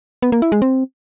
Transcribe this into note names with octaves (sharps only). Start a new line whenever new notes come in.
B3
A#3
E4
G#3
C4